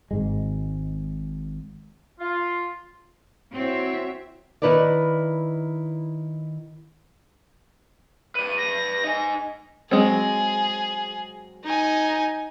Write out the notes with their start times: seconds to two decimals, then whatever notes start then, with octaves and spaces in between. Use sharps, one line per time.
0.11 G#1 G#2 G#3
2.19 F4
3.55 C4 E4 F#4 C#5 E5
4.62 D#3 E4 A#4 B4 C#5 D5
8.35 B4 D5 D#7
8.57 A#6
9.04 D#4 G#5
9.91 F#3 G#3 C4 G#4
11.64 D#4 G#5